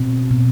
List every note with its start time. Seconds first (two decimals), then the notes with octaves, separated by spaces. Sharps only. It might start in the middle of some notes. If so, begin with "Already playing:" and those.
Already playing: B2 C4
0.31 B2